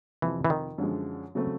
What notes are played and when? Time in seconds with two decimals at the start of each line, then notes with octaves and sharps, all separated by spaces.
0.22 F2 C3 E3 F3
0.45 E3
0.50 D#3
0.78 F#2 D3 F3 G#3
1.35 C#3 F#3 A3 C4